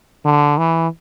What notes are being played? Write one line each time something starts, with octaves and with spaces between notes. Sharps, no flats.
D3
E3